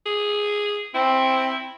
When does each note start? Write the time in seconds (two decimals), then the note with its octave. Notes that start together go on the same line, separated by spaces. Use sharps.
0.06 G#4
0.94 C4 E4